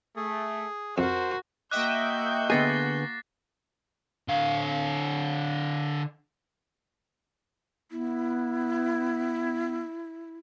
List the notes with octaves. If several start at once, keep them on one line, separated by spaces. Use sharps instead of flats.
A3 G#4
F2 F#4 A#4 C5
A#3 F#4 D#5 E5 G5 D6 F#6 G6
D3 B3 G#4 A6 A#6 C7
D3 F5
B3 E4